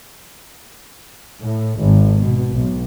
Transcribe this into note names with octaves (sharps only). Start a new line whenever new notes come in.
A2
G#1
B2
B1